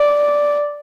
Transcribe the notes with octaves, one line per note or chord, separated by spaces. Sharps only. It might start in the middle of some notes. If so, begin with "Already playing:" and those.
Already playing: D5